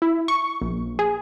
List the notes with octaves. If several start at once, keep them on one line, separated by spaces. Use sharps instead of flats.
E4
C#6
A#1
G#4